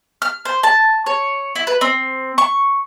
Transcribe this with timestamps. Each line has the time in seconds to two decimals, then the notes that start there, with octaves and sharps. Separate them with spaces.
0.22 F6
0.45 C5
0.63 A5
1.06 C#5
1.55 E4
1.67 B4
1.81 C4
2.38 C#6